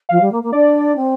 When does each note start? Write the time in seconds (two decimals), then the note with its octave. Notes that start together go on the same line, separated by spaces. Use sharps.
0.09 F3 F5
0.20 G3
0.31 A#3
0.42 A#3
0.52 D4 D5
0.95 C4